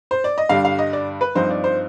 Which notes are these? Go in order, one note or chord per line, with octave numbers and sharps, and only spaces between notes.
C5
D5
D#5
G2 D3 G3 D4 F5
F5
D#5
D5
B4
G2 F3 C4 D#4 C5
D5
C5